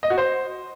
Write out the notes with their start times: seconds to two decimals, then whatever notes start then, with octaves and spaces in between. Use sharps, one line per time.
0.03 D#5
0.10 F#4
0.18 C5